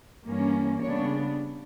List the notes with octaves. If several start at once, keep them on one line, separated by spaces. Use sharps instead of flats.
G2 E3 A#3 C#4
C#3 G3 B3 D4 C#5